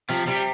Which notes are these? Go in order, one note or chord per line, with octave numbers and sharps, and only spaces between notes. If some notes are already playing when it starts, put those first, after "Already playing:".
C3 F3
C3 G3